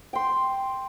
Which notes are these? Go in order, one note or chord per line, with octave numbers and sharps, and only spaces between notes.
G5 C6